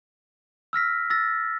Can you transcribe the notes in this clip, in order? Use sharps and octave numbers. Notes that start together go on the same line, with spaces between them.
E6 F6 A#6 B6
E6 A6 A#6